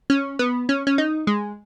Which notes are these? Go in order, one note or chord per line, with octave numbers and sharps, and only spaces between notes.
C#4
B3
C#4
C#4
D#4
G#3